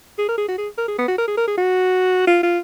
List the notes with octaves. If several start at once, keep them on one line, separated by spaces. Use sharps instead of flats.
G#4
A#4
G#4
F#4
G#4
A#4
G#4
B3
F#4
A#4
G#4
A#4
G#4
F#4
F4
F4